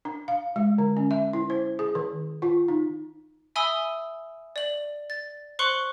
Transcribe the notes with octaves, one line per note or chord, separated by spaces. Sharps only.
D4
F5
G#3
D3
C#4
E5
E4
C5
G#4
D#3
F4
D#4
E5 G#5 B5 D#6 E6 G7
D5 F#7
A6
C5 C6 C#6 F#6 C#7 F#7